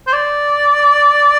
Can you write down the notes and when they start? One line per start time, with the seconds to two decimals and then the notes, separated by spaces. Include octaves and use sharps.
0.07 C5
0.13 D5